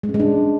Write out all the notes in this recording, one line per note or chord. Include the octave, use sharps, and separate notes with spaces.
G#3
C#4
G#3
D4